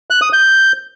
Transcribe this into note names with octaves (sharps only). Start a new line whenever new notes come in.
F#6
D#6
G6